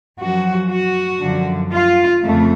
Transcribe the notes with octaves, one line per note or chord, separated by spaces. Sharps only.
F#2 F3 F#4
F#4
F#2 D3 F3
F4
F2 C#3 A3